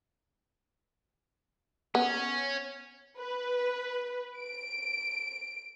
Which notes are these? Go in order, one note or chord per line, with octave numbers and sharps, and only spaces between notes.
B3 C#4
B4
D7